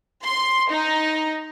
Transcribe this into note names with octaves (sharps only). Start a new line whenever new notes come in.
C6
D#4